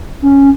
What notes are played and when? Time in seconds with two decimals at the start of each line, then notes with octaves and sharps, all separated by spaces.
0.22 C#4